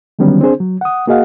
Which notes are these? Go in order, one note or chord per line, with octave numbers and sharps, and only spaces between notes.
D3 D#3 F#3 G3 B3 C#4
C4 D4 G#4 C5
F#3
F#5 D#6
A#3 F#4 G#4 D#5 F5 F#5